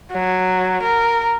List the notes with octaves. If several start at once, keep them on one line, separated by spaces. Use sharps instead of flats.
F#3
A#4